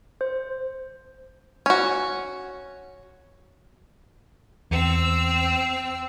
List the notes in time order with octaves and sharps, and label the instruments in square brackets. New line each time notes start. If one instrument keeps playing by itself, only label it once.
[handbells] C5
[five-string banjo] C#4 F#4
[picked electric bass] E2 [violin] C4 E6